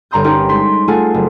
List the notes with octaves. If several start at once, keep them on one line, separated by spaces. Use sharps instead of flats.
G1 C#5 A#5 C6 D#6 G6
C#4 D#4 G4 A#4 C#5
G#3 C5 C6 B6
A3 F4 G#4 F#5 G#5
F#1